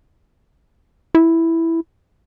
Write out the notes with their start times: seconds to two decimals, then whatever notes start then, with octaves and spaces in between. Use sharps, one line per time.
1.15 E4